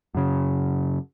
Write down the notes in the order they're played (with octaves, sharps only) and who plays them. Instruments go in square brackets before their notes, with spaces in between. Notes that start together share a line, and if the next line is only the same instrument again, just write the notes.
[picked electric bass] F#2 C#3